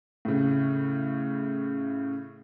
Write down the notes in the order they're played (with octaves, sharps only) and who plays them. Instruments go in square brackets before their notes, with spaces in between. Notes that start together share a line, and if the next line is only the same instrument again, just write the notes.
[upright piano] A2 C#3